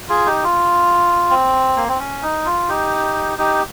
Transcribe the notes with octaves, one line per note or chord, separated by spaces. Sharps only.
F4 G#4
D#4 G4
F4
C4
A#3
C4
C#4
D#4
F4
D#4 G4
D#4 G4